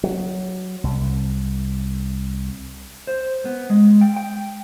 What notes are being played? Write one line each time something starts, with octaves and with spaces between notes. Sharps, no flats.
F#3
C2
C5
B3
G#3
G5
G5